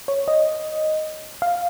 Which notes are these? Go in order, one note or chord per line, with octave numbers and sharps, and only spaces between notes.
C#5
D#5
F5